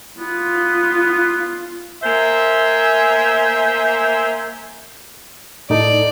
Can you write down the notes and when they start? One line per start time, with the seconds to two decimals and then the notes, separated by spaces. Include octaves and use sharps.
0.19 B3 F4
2.03 A#3 C5 E5 G#5
5.70 A2 D#4 A4 D5